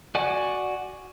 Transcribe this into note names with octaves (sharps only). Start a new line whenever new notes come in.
F#4 D5 F#5 G#5